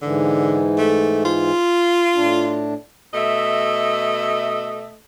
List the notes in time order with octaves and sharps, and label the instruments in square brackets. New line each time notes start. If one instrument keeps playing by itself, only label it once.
[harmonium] G#2 E3 [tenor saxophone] D3
[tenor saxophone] A3
F4
[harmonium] A2 D4
[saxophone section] B2 A3 D#5 E5